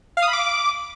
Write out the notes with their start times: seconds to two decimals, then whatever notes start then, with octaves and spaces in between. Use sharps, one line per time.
0.17 F5
0.22 D#6
0.28 B5
0.33 D6